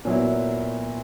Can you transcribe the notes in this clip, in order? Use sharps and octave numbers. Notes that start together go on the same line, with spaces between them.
A#2 F#3 B3 E4